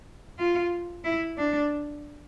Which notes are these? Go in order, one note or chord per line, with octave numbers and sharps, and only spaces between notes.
F4
E4
D4